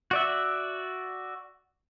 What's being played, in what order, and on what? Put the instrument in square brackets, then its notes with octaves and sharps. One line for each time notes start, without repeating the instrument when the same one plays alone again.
[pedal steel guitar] F#4 D5 E5